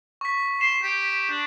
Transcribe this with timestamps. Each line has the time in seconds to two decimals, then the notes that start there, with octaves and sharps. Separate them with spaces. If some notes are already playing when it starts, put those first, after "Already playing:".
0.21 C#6 B6
0.61 C6 E7
0.83 G4
1.30 D4